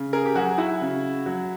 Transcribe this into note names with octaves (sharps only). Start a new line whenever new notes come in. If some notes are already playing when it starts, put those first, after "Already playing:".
Already playing: C#3
G#4 A#4
G4
F#3 F#4 G#4
E4 F#4
C#3
F#3